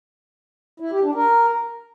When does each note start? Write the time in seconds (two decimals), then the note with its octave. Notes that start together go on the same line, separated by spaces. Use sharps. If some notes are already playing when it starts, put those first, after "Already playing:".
0.80 E4
0.92 G4
1.03 D4
1.15 A#4